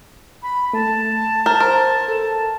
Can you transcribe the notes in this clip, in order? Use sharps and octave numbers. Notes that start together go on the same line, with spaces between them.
B5
A3 A5
A#4 G6
A#4 C5
A4